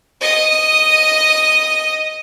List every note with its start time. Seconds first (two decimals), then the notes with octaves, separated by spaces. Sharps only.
0.21 D#5 D#6